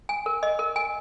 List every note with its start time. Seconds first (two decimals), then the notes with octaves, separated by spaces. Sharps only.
0.09 G#5
0.26 A#4
0.43 D#5
0.59 A#4
0.76 G#5